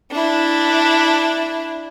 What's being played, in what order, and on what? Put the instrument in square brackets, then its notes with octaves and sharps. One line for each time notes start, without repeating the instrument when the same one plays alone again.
[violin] D4 E4